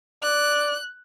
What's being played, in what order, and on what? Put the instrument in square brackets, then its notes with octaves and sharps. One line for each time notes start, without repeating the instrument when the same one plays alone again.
[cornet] D5 [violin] F#6